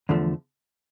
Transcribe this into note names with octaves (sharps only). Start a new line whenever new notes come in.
E2 D3 F3 A3